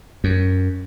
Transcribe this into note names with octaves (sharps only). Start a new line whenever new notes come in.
F#2